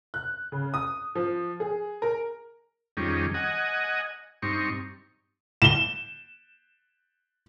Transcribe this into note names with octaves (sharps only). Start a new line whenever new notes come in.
F#6
C#3
D#6
F3
G#4
A#4
F2 D#3 G3 C#4 G#4
D#5 F#5 G#5
G2 C4 D#4 C#6
E7 G7